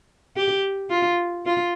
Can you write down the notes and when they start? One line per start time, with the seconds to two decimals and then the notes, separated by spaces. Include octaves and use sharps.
0.36 G4
0.90 F4
1.45 F4